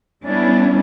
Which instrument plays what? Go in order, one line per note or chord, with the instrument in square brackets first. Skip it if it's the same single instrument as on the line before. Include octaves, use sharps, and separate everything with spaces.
[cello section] G3 B3 C#4 D4 E4